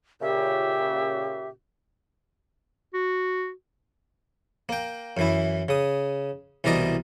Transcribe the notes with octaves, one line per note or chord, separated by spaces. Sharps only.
A#2 C#3 G4 E5
F#4
A#3 G5
F#2 E3 E4
C#3 D#6
C2 B2 E3 A#4 D5 D#5